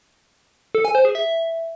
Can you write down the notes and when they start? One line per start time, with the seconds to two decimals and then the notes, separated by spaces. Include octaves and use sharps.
0.75 A4
0.85 G#5
0.95 C5
1.05 G#4
1.15 E5